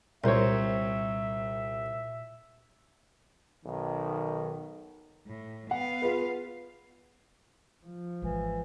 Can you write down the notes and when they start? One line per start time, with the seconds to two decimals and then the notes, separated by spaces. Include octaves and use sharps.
0.24 C2 A#2 A#4 C5 C#5 E5
3.66 B1 D#3
5.27 A2
5.71 B3 F5 F#5
6.02 F4 G#4 B4
7.85 F3
8.22 G#1 E3